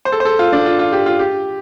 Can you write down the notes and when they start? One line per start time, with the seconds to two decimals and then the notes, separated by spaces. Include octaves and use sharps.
0.05 C5
0.12 A4
0.20 C5
0.25 A4
0.39 F4
0.53 D4
0.66 F4
0.79 F4
0.93 G4
1.06 F4
1.19 G4